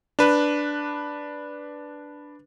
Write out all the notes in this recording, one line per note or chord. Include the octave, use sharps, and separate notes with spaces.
D4 B4